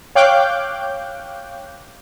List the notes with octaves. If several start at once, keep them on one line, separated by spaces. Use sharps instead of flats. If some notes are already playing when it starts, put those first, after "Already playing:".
C#5 F5 G5 D6 F#6 G6